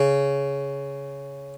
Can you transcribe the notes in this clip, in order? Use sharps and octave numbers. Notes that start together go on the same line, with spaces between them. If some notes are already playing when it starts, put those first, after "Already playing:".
Already playing: C#3